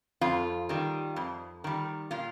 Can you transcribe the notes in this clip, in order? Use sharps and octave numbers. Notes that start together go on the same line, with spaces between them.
F2 F4
D#3 G3
F2
D#3 G3
A#2 F4